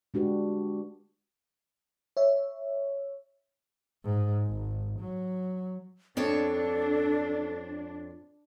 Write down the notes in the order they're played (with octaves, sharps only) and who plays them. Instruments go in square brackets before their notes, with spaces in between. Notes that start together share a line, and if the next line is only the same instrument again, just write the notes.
[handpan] G#3 D4 F#4 G4 B4
[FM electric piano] C#5 E5
[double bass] G#2
G#1
F#3
[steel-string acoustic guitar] F2 C4 C#5 [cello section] D4 [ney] A4